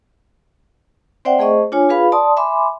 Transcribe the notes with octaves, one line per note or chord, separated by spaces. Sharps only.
C4 C5 D5 E5 F#5 G5
A3 G#4 C5 D#5 C#6
D4 F4 C#5 G#5
F4 G#4 B4 F5 B5
D5 A5 C6 D#6
E5 G#5 B5 C6 D6